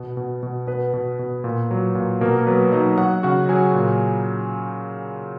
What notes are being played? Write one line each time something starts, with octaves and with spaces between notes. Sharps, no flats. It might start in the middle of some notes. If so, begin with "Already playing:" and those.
Already playing: B2 B3
B2
B2
B2 B3 B4
B2
B2
A#2
F#3
A#2
B2 A#3 A#4
F#3 B3 B4
F#3 D#4 D#5
F#3 F#4 F#5
C#3 F#4 F#5
F#3 G#4 G#5
A#2